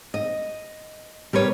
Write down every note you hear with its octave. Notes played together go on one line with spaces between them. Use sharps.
D#5
G3 A#4 B4 C#5